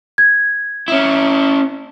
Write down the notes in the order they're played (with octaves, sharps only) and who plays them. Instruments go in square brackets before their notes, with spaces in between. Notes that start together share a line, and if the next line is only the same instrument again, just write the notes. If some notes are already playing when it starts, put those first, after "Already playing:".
[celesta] G#6
[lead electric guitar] C#4 E4